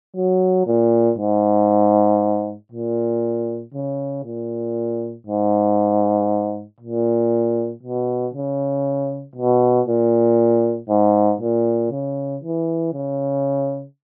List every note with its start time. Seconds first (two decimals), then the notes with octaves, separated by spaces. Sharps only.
0.16 F#3
0.67 A#2
1.18 G#2
2.72 A#2
3.74 C#3
4.24 A#2
5.27 G#2
6.81 A#2
7.83 B2
8.34 C#3
9.36 B2
9.87 A#2
10.90 G#2
11.41 A#2
11.92 C#3
12.43 E3
12.94 C#3